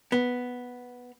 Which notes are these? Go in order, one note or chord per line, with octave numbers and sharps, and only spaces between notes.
B3